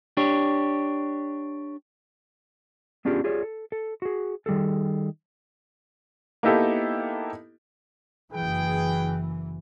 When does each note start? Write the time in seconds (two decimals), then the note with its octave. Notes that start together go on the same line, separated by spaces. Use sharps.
0.17 D4 G4 C#5
3.05 B3 C#4 D4 F4 G4 G#4
3.24 F4 G4 G#4 C#5 D5
3.42 A4
3.72 A4
4.02 F#4 G#4
4.46 D#3 G3 G#4 A4
6.43 A#3 B3 D#4 E4 G4 A4
8.33 F#1 E3 G#4 B4 G5